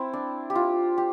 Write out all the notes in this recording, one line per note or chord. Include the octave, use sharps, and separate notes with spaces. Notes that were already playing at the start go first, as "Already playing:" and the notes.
Already playing: C4 E4
D4
G4
F4
G4